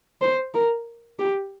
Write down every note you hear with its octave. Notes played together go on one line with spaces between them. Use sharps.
C5
A#4
G4